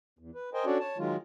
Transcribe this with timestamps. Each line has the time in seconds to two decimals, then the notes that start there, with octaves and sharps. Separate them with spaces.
0.19 E2
0.35 B4
0.54 A#4 C5 D#5 G5 G#5
0.66 C#4 D4 F#4 A4 C#5 D5
0.80 C#5 A5
0.98 D#3 F#3 G#3 F4